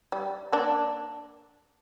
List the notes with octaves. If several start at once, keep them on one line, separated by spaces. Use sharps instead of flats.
G3
A#3 D4